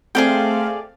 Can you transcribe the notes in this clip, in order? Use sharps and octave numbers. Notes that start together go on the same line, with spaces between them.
A3 C4 G#4 D5 F5 G5